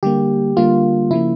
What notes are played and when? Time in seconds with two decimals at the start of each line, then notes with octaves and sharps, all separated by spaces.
0.03 D3 G3 A#3 G4
0.57 D3 G3 A#3 F4
1.11 C#3 F3 A#3 E4